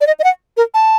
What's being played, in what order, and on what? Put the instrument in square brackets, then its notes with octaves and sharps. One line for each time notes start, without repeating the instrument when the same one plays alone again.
[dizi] D5
D#5
D#5
F#5
A#4
A5